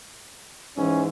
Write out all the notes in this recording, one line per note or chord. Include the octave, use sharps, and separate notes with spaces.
G#2 E3 C#4